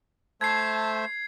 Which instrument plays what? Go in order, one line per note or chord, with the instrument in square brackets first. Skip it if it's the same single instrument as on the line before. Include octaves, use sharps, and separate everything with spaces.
[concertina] A3 C5 E5 [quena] A5 [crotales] G#6 C7